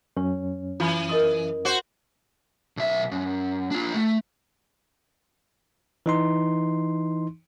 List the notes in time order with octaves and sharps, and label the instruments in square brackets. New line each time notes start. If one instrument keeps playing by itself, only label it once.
[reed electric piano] F#2 C#4 [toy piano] C#5
[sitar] E3 [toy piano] F4 B5
[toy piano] A#4 D#5 D#6
[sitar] F#4 C5
[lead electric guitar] B1 E5
F#2
D4 F4
A3
[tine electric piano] E3 D#4 C6